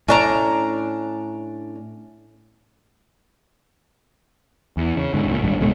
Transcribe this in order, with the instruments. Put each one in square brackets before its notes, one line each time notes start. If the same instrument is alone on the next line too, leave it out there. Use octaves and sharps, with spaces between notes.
[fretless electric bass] A2 [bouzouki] C#4 D4 A#5
[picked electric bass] E2
C#3
G#2 D3
C#2 A#2
G#1 C#2 G2
D1 B2 G#3 A3